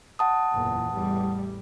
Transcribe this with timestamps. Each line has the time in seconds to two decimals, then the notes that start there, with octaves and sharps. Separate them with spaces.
0.19 F#5 A5 D#6
0.53 F#1 E2 A#2
0.92 A1 E2 G3